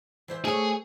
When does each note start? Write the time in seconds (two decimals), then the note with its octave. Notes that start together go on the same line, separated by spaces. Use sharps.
0.28 E3 C5 E5
0.45 A3 G#4 C#5